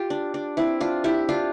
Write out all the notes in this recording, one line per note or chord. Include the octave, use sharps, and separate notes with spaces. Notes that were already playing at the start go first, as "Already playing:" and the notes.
Already playing: F4 G4
D4
D4
C4 E4
D4 F4
E4 G4
D4 F4